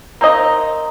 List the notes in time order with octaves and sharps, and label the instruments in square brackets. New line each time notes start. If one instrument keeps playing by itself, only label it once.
[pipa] A#3 C4 D#4 D#5